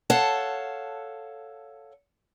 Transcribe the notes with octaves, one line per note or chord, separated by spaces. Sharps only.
A4 C#5 F5 F#5 A5